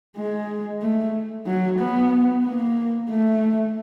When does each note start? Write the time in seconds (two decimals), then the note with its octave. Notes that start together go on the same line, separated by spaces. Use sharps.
0.16 G#3
0.82 A3
1.46 F#3
1.79 B3
2.45 A#3
3.10 A3